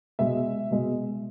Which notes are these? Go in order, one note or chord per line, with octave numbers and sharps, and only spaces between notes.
B2 G#3 E5
B2 G#3